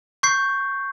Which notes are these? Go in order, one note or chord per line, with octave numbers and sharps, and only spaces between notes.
C#6 G6 C7